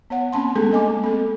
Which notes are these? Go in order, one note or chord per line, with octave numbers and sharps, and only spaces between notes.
B3 C#5 F#5
A#3 C4 C#4 A5 C6
G#3 A3 B3 D4 G#4 A4
A#3 D#5 G#5 D6
G#3
C4 A4